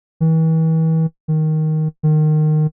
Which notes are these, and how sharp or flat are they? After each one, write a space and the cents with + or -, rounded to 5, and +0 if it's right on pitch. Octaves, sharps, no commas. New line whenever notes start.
E3 -40
D#3 +5
D#3 -20